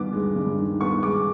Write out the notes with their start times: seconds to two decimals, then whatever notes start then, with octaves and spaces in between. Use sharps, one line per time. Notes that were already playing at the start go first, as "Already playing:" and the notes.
Already playing: G2 D#3 B3 D6
0.13 G#3
0.36 G2
0.58 D#3
0.81 B3 C#6
1.03 G#3 D6